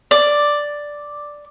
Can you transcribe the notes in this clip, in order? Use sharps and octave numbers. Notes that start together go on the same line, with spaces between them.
D5